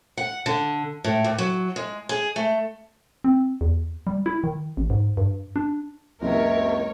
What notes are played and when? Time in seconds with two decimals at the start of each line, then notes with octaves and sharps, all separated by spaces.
0.18 F#5
0.46 D3
1.04 A2
1.24 D#2
1.38 F#3
1.76 G#3
2.09 G#4
2.36 A3
3.24 C4
3.61 E2
4.07 G3
4.26 E4
4.44 D#3
4.77 A1
4.90 G#2
5.17 G2
5.56 D4
6.21 F#1 C#2 C3 E3 A#4 C#5 E5